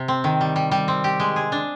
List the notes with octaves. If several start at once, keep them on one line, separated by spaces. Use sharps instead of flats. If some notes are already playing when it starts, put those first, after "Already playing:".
Already playing: C3
C4
D#3
G3
G3
G3
C4
G4
G#3
G#4
D4